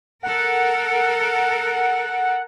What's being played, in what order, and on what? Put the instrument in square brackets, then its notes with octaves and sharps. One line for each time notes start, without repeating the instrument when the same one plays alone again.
[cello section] A4 A#4 [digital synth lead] F#5